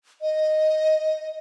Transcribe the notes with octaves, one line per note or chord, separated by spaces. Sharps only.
D#5